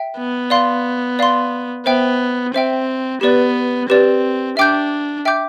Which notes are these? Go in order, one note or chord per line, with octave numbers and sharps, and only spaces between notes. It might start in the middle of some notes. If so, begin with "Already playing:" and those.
Already playing: E5 G5
B3
D5 F5 C6
D5 F5 C6
B3 C5 E5 G5
C4 C5 E5 G5
B3 G4 B4 D5
C4 G4 B4 D5
D4 E5 G5 D6 G6
E5 G5 D6 G6